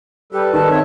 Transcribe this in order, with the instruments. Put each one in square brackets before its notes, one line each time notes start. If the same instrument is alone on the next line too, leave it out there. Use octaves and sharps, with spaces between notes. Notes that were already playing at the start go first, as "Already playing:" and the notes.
[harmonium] G3 A4 B4 [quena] G4
[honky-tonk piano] D#3 [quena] A5
[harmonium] C4 C#5 E5